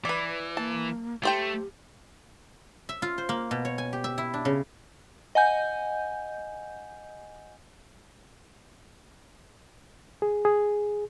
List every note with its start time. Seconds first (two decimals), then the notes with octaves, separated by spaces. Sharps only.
0.05 E3 B4 D5
0.57 A#3 A5
1.23 A3 G4 A4 C5 G5
2.89 E5
3.02 F4
3.18 C5
3.29 A#3
3.51 B2
3.65 C#5
3.78 G#5
3.93 G4
4.04 E5
4.18 E4
4.34 D4
4.45 C#3
5.35 D#5 F#5 G#5 G6
10.22 G#4
10.45 G#4